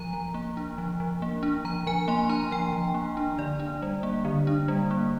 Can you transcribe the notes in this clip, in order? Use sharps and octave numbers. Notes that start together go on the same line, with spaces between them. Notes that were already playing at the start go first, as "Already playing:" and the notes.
Already playing: F3 A#5
F3
A#3
D4
F3
F3
A#3
D4
F3 A#5
F3 G#5
A#3 C6
D4 A#5
F3 G5
F3
A#3
D4
D3 D5
D4
G3
A#3
D3
D4
G3
A#3